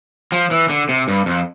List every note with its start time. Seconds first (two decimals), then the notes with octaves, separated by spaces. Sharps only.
0.32 F3
0.51 E3
0.69 D3
0.89 C3
1.08 G2
1.26 F2